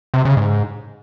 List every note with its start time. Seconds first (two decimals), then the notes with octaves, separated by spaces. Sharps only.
0.14 C3
0.25 C#3
0.37 G#2